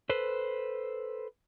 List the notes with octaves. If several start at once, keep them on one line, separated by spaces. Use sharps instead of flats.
A4 B4 C5